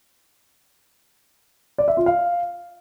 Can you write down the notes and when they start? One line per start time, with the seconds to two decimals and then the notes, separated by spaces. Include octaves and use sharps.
1.78 D5
1.88 E5
1.97 F4
2.06 F5